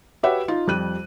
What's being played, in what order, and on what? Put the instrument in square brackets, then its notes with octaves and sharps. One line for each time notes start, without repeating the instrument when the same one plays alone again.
[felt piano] F#4 G4 B4 C#5 E5 F#5
D#4 F4
F2 G3 F#6 D#7